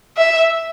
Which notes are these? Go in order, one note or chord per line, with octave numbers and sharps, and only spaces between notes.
E5